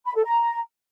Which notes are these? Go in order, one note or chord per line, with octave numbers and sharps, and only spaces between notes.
B5
A4
A#5